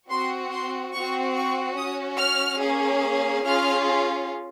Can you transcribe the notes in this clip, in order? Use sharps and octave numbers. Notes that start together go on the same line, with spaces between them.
C4 F#4 C6
C6
C4 F#4 C#6
C#6
C#4 F#4 D#6
F6
A#3 C#4 G#4
C#4 F4 G#4 F6